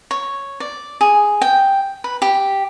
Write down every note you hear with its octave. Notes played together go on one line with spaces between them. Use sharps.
C#5
D5
G#4
G5
B4
G4